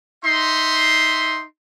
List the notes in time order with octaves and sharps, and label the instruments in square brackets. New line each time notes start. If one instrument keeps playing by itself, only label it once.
[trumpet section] D#4 E5 C6